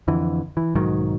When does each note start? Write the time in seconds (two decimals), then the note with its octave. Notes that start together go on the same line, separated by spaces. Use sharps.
0.08 F2 D3 E3
0.57 E3
0.75 B1 G#2 D#3 F#3